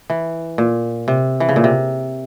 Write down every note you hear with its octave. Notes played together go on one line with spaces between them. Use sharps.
E3
A#2
C3
E3
C#3
A#2
C3